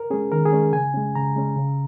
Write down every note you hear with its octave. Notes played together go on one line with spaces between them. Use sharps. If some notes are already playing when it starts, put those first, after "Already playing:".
Already playing: A#4
G#3 C#4 G#4
D#3 A#4
G#4
G#3 C#4
C#3 G#5
G#3 C#4
C#3 A#5
G#3 C#4
C#3